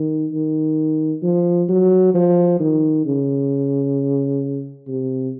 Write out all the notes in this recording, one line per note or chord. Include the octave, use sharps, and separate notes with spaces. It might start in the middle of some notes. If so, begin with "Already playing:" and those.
Already playing: D#3
D#3
F3
F#3
F3
D#3
C#3
C3